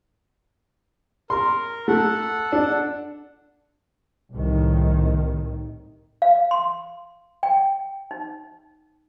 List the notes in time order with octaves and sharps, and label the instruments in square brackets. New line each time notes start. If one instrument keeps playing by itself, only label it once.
[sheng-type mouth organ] A#4 [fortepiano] C6
[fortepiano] A3 [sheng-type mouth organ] A4 F#5
[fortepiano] D4
[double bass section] C2 A2 D#3
[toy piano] F5
C6
G5
D#4